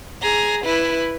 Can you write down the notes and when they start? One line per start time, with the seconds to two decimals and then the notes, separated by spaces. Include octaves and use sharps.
0.22 G#4 A#5
0.65 E4 B4